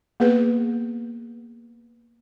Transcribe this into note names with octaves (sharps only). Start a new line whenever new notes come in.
A#3 B3 G#4 B4